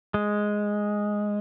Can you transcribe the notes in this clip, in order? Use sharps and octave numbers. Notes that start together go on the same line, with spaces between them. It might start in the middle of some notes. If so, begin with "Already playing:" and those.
G#3